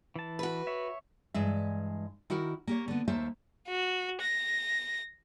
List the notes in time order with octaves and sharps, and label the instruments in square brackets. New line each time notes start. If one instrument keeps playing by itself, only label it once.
[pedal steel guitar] E3 A5
[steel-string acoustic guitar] F#4 B4
[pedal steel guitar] C#5 E5
[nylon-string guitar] G2 E3 G#3 E5
D#3 E4 F#4 A#4
A#3 G4 C#5
D3 B3
D#2 A3 A#3 C5 E5
[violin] F#4
A#6